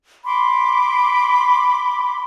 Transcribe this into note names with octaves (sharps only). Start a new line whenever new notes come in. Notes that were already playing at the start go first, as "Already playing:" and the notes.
B5 C6 D6